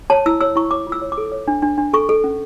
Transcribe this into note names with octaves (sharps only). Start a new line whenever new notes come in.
C#5 A5
E4 E6
C#5 E6
E4 C#6
C#5 D6
F4
E6
C#5
D6
A4
C#5
D4
D4
D4
A4 C#6
A4
C#4